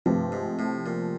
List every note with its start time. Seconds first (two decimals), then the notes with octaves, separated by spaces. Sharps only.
0.06 G2 C3 F3 A3 C4
0.32 G#2
0.59 A2
0.86 A#2